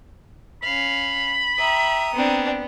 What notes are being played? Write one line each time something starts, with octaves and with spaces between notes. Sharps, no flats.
C#4 F5 B5
E5 G5 A#5 D#6
B3 C4 D4